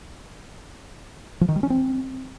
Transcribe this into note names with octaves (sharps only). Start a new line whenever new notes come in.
F3
D#3
G3
C#4
C4